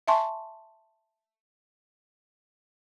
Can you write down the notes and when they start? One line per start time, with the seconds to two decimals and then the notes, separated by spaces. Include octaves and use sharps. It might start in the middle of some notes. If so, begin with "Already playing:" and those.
0.08 E5 G#5 A5 C6 C#6